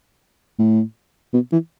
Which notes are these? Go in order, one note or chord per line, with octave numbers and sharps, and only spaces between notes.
A2
B2
E3